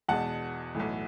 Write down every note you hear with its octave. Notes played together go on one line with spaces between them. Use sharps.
E2 B2 G#3 F#5 A5
B1 A2 E3